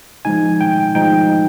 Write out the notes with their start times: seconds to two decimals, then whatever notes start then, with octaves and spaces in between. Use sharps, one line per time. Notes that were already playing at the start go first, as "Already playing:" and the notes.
0.25 F3 G#3 D#4 G#5
0.61 G5
0.95 F3 G#3 D#4 G5